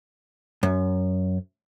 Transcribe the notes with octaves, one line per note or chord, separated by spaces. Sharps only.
F#2